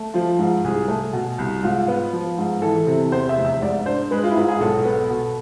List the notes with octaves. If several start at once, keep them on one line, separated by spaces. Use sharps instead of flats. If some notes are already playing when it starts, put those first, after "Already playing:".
Already playing: A3
F3 F4
G#2
C2 G#4
A3
B2
C2
G#2 F4
B3
F3
G#2
E3 A4
C3
E2 C5
E5
F1
E5
G#2 D5
D4 C5
G#3 B4
F4
E4
G#2 F4
G#4
B1 A4
B3
B2